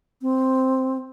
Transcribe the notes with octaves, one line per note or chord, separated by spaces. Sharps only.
C4